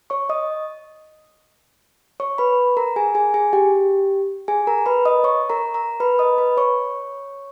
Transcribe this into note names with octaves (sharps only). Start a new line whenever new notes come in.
C#5 C#6
D#5 D#6
C#5 C#6
B4 B5
A#4 A#5
G#4 G#5
G#4 G#5
G#4 G#5
G4 G5
G#4 G#5
A#4 A#5
B4 B5
D#5 D#6
C#5 C#6
A#4 A#5
A#4 A#5
B4 B5
D#5 D#6
B4 B5
C#5 C#6